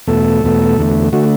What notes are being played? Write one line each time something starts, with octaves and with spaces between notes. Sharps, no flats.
E2 B2 A3 A4
E2 B2 A3
E2 D3 A3
D3 A3 F#4